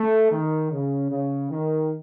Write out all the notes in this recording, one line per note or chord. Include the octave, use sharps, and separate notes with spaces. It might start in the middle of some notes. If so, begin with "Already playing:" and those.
Already playing: A3
D#3
C#3
C#3
D#3